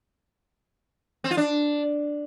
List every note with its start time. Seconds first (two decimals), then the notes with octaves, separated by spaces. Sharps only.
1.24 C4
1.31 F4
1.37 D4